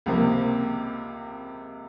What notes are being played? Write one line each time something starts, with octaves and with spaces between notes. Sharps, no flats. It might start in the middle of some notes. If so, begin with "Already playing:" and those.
C#2 C3 F3 A#3